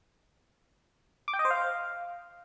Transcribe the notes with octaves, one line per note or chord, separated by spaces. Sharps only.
D6
G5
D#5
C5
F5